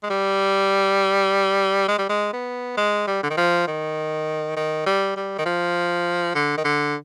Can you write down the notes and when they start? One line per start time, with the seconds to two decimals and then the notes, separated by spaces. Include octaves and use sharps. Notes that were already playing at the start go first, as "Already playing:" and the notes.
0.03 G#3
0.10 G3
1.88 G#3
1.98 G3
2.09 G#3
2.33 B3
2.77 G#3
3.07 G3
3.23 D3
3.30 D#3
3.37 F3
3.67 D#3
4.56 D#3
4.86 G3
5.16 G3
5.38 D#3
5.45 F3
6.35 D3
6.58 D#3
6.65 D3